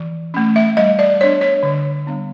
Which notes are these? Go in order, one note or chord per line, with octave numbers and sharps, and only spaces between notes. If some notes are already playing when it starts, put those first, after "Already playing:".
Already playing: E3
A3 C#4
E5
G3 D#5
D5
B3 D4 C#5
C#5
D3
G3 B3 D4